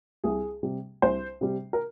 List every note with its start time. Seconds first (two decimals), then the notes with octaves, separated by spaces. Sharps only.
0.24 C2 G#4
0.63 C3 G3
1.02 C2 C5
1.41 C3 G3
1.73 A#4